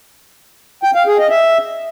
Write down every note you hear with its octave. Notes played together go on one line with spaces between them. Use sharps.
G5
F5
G#4
D#5
E5